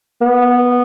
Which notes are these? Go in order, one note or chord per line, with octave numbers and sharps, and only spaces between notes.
B3